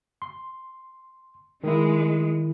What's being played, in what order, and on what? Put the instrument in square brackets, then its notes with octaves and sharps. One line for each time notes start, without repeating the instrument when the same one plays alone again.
[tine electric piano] C6
[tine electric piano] D#3 E4 [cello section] G#3